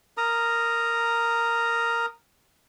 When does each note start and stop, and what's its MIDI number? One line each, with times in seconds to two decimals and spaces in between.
0.17 2.06 70
0.17 2.06 82
0.17 2.06 87